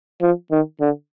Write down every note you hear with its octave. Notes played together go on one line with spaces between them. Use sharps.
F3
D#3
D3